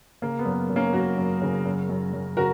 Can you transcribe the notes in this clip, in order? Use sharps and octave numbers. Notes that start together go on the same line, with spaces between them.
C#3 A#3
B3
F#2
F#2
A#3 C#4
F#2 F#4 A#4
F#2
C#3
F#2
F#2
F#2
C#3 F#4 A#4